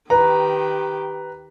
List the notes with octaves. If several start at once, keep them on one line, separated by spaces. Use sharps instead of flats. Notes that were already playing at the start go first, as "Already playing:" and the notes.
D#3 G4 B4 A#5